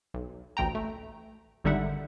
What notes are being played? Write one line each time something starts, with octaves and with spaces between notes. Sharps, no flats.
B1
A1 D2 G5 A#5
A3
G#1 D3 G3 D#4 E5 F#5